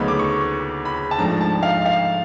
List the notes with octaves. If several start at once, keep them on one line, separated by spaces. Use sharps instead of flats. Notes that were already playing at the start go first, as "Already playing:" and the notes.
Already playing: D2 C#3 F#3 B3 D#4 B5
D6
C#6
B5
A5
G#2 F3 A3 D4 A#5
A5
F5
F5